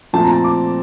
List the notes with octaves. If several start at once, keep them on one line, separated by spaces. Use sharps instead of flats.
A#2 F3 A3 C4 A5
A#5
A5
D6